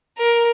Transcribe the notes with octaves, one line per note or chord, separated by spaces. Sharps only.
A#4